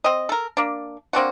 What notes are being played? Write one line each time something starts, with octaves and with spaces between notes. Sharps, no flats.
C4 D#5
A4 A#4
A#3 D4
A#3 C4 D4 F#4